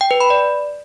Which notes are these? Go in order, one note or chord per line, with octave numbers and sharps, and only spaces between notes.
G5
B4
B5
D5